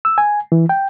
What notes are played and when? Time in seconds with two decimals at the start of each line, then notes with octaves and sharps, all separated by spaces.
0.05 E6
0.18 G#5
0.52 E3
0.69 G5